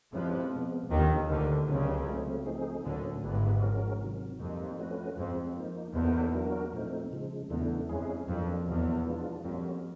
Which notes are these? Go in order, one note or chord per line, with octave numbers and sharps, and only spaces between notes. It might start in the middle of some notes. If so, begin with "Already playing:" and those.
F2 F3 G#3 C#4 E4 G4 B4
B2 G#3 B3
D#2 D3 D#3 F3 A#3 D#4 G4
D2 D3 A#3 D#4 G4 A#4
C#2 C#3 F#3 A#3 D4 G4
F#3 A3 C4
F3 A3 C4 D#4 G#4
D2 A2 D3 F#3 A#3 C#4
G#1 G#2 G#3 B3 E4 G4 B4
F3 G#3 C#4 F#4 A#4
C3 D#3 F#3
F2 G3 A#3 D#4
F3 A3 C#4 F#4 B4
F2 F3 G#3 C4
F3 A#3 D#4
E2 A#3 D#4 F#4 A4 C5
F#3 A#3 D4 F#4 A#4
A#2 F3 A3 C4 D#4
C#3 F3 G#3
E2 C#3 E3 A3 D4
F2 G#3 C#4 E4 G#4
F2 F#3 A#3 D4
E2 B2 F#3 A#3
F3 G#3 B3 D4 F4
F2 G3 A#3 C#4 F#4